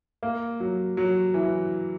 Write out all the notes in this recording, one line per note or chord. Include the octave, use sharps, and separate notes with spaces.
A#3
F#3
F#3
E3